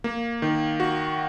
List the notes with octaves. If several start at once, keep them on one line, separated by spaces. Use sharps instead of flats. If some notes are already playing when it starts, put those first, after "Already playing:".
A#3
D#3
F#4